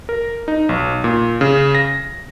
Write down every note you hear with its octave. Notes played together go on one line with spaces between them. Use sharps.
A#4
D#4
B1
A#2
C#3
A#6